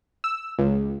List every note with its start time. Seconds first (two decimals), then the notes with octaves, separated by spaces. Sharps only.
0.24 E6
0.58 C#2